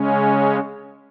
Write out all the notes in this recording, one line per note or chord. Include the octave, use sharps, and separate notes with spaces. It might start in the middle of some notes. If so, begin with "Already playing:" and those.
Already playing: C#3 G#3 C#4